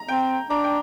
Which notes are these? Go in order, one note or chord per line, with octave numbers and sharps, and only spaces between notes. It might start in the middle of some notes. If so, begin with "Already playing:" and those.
Already playing: A#5
C4 G5
D4 A#5
G5